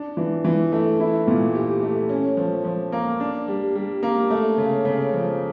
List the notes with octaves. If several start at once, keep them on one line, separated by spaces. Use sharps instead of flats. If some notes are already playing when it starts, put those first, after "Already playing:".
Already playing: D4
E3
E3
A3
E4
A#2
G4
A3
C#4
F3
F3
A#3
D4
G3
G3
A#3
A3
C#3
C#3
F3